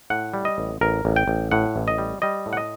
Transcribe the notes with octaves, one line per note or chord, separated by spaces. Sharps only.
A2 F#5
G3
D#5
A1
A1 A#4
A1
G5
A1
A2 F#5
A1
D#5
G3
G3 D#5
A2
F#5
D#5